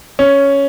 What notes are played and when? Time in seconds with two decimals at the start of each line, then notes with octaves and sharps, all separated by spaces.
0.19 C#4